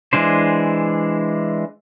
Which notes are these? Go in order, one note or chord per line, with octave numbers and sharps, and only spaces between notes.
E3 G#3 D4 C5